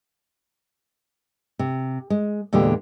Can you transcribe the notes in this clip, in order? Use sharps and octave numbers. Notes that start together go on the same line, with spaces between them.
C3
G#3
E2 A#2 D3 G#3 G4